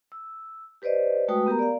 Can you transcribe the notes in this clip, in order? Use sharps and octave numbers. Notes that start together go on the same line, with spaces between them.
E6
G4 B4 C5 D5 D#5
G#3 A3 F#4 B4 G5 D#6
B3 G4 A#4 A#5
D5 F5